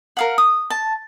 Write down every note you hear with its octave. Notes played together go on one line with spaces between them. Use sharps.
A#4 F5 F#5
D#6
A5